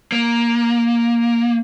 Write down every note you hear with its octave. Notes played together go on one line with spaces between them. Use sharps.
A#3